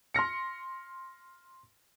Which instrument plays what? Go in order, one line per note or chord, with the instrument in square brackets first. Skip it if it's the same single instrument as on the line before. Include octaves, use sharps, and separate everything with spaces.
[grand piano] C6 F6 A#6 C#7